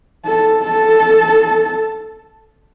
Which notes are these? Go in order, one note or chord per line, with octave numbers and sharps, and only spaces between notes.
A4
A4